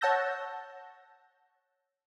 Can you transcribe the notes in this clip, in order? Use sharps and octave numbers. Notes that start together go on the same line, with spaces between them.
C#5 F#5 A5 E6 G6 A#6